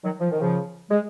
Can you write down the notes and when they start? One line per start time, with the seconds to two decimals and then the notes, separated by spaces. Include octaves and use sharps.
0.04 D#3 F#3
0.20 F3
0.30 D#3
0.41 C#3 F3
0.90 G#3